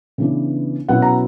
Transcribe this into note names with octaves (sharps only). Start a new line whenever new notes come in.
C#3 E3 B3 D4
B2 F#3 C#4 E4 F#5
A#5